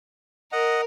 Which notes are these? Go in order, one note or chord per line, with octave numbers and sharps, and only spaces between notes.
A#4 D#5 F#5